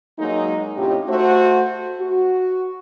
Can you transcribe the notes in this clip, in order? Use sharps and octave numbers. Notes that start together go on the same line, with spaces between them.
F#3 G#3 A#3 D#4
A2 C3 C#4 D#4 F4 G4
A3 F#4 C5
F#4